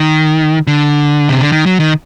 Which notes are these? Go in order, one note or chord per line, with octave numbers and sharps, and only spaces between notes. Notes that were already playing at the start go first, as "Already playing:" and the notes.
Already playing: D#3
D3
C3
D3
D#3
F#3
D#3